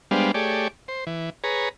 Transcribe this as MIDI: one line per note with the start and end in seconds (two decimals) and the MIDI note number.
0.11 0.31 55
0.11 0.31 56
0.11 0.31 59
0.11 0.31 62
0.11 0.31 72
0.11 0.31 77
0.34 0.68 57
0.34 0.68 67
0.34 0.68 68
0.34 0.68 73
0.34 0.68 74
0.88 1.04 72
1.07 1.30 52
1.44 1.69 68
1.44 1.69 71
1.44 1.69 73
1.44 1.69 82